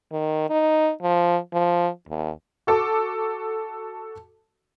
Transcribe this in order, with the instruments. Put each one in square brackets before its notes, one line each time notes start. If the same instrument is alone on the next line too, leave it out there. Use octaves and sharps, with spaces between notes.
[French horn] D#3
D#4
F3
F3
D#2
[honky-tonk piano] F#4 A4 A5 D6